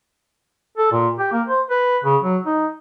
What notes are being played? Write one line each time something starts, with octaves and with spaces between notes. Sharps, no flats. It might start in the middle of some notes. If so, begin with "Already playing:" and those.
A4
A#2
G4
A#3
C5
B4
C#3
F#3
D#4